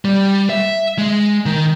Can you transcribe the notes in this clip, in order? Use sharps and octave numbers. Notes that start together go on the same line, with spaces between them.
G3
E5
G#3
D#3